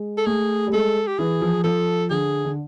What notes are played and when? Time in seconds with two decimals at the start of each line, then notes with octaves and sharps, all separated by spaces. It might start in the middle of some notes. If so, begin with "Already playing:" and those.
Already playing: G#3
0.18 A4
0.26 A3 G#4
0.67 G3
0.72 G#3 A4
1.07 G4
1.19 E3 G#4
1.41 F3
1.64 F3 A4
2.10 D3 G#4
2.45 D3